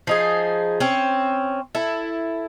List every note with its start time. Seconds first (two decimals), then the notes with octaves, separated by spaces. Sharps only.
0.07 F3 D#4 G#4
0.80 C4 C#4
1.75 E4 A4